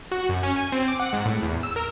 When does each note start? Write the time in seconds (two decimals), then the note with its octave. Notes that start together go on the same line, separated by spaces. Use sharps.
0.12 F#4
0.29 F#2
0.43 C#4
0.56 G#5
0.72 C4
0.88 D6
1.00 F#5
1.13 G#2
1.26 A2
1.42 E2
1.63 E6
1.76 A#4